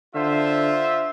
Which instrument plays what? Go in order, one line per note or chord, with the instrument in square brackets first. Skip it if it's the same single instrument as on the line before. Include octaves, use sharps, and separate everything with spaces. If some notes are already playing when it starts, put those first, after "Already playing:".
[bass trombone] D3 [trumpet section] F4 C5 E5